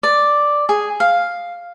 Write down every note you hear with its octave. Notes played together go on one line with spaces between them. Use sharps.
D5
G#4
F5